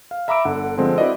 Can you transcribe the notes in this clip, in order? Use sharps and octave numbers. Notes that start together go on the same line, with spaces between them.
F5
E5 A#5 B5 D6 E6 D7
G1 D3 F#5
D3 F3 G#3 C4
E4 F#4 B4 D5 D#5